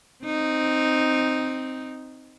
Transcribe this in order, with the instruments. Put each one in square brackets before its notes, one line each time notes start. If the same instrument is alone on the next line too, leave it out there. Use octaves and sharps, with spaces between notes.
[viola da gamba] C4 D#4